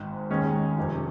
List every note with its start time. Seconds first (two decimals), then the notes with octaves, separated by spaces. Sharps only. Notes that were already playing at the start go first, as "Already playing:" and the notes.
Already playing: G#1 G#2 D#3
0.30 D#2 D#3 G#3 C#4
0.77 F1 F2 C3